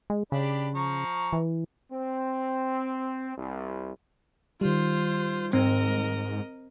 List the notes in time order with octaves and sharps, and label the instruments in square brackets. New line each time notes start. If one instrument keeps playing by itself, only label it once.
[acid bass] G#3
[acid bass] C#3 [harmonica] D4 G4 B5
[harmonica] F3 A#5 C#6
[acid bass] E3
[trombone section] C4
C2
[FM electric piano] D#3 G3 [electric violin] F4 C5
[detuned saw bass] G#2 [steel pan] C4 [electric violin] A#4 D#5